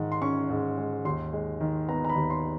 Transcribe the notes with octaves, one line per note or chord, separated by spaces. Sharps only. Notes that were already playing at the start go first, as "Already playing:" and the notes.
Already playing: G#2 D#3 G#3
C6
C#4 C#6
G#2
G#3
D#2 C6
G#3
D#3
B3 A#5
A#5
B5
D#2
C6